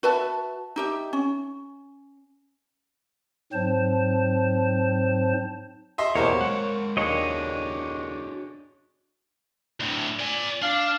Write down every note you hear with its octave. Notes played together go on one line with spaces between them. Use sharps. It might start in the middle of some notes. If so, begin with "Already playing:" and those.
F#4 B4 E5 A5
D#4 G4 E5
C#4
G#2 F#3 C4 C5 A5
D#5 E5 C6
E2 B2 A#3 G4 C5 C#5
G#3 A#4 F#5
D#2 D4 F#4 G#4 A4 C#5 D#5
D2 A2
D5 G#5
D4 F5